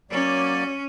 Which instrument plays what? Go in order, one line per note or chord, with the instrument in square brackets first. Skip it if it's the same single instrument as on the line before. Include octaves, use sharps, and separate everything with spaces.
[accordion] F#3 A#3 D5 [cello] C#4